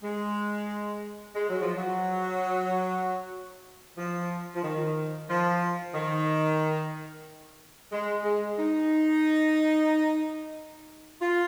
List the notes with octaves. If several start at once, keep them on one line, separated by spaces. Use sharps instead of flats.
G#3
G#3
F#3
F3
F#3
F3
F3
D#3
F3
D#3
G#3
G#3
D#4
F4